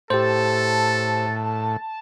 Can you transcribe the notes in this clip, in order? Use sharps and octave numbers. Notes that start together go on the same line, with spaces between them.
A2 G4 A4 C5 A5